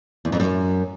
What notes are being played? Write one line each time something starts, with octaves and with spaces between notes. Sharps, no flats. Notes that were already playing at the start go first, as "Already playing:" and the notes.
E2
F2
F#2